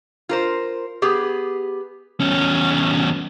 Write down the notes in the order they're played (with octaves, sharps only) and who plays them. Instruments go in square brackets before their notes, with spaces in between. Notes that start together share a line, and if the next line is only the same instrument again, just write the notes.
[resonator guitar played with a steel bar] F4 A#4 C5
B3 G4 G#4
[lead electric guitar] E2 C#4